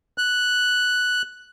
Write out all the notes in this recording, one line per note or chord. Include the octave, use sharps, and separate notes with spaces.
F#6